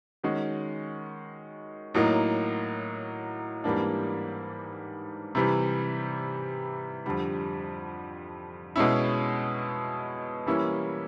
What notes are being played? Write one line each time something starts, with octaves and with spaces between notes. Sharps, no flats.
D#3 G#3 C#4 F#4
A2 F#3 A#3 D#4
G#2 E3 G3 A#3 D4
C3 E3 G3
F2 D3 G3
B2 G#3 C#4 E4
E3 G3 A#3 C#4 E4